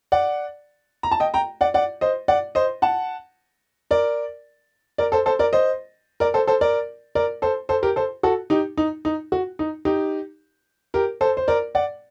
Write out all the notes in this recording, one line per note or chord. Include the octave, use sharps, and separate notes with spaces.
D5 F#5
A#5
A5
D#5 G5
G5 A#5
D5 F#5
D5 F#5
C5 D#5
D5 F#5
C5 D#5
F#5 A5
A#4 D5
A#4 D5
A4 C5
A4 C5
A#4 D5
C5 D#5
A#4 D5
A4 C5
A4 C5
A#4 D5
A#4 D5
A4 C5
A4 C5
G4 A#4
A4 C5
F#4 A4
D#4 G4
D#4
D#4
F#4
D#4
D#4 G4
G4 A#4
A4 C5
C5
A#4 D5
D5 F#5